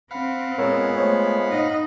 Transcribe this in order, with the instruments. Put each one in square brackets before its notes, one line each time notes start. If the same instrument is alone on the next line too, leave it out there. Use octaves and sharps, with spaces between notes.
[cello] C4 [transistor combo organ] F5 F#5 B5
[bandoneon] A#2 G#3 B3 [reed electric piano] A#4 C#5 E6
[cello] A3 [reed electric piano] C5 C#5
[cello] D#4 D#5